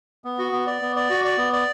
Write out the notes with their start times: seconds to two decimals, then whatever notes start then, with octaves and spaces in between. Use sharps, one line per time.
0.24 B3
0.39 F#4
0.52 B3
0.67 D5
0.82 B3
0.96 D5
1.10 F#4
1.25 D5
1.38 B3
1.53 D5